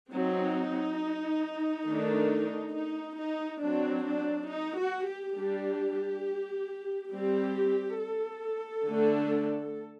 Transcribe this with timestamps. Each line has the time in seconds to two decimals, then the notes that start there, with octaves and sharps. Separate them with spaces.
0.12 F#3 C4 D#4
1.87 D#3 A3 D4
2.74 D#4
3.18 D#4
3.62 F#3 C4 D4
4.06 D4
4.49 D#4
4.79 F#4
5.08 G4
5.36 G3 D4 G4
7.12 G3 C4 G4
7.99 A4
8.86 D3 A3 D4